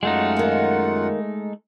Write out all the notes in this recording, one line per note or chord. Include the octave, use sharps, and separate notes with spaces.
F#2 G#3 A3 D#4 F4 F#5
D#3 A#3